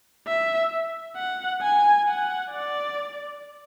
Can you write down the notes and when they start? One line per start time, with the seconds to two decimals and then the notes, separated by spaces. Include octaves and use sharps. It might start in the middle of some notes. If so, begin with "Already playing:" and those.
0.27 E5
1.16 F#5
1.61 G#5
2.07 F#5
2.51 D5